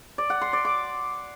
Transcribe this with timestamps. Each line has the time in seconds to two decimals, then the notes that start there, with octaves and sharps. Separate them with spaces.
0.18 D5
0.30 F#5
0.41 C6
0.53 D5
0.65 D6